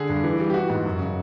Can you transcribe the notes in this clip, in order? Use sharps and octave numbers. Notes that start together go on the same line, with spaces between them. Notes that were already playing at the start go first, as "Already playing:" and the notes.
Already playing: D3 G#4
G2
E3
G3
G4
E3 F#4
G#2
F#2
C#3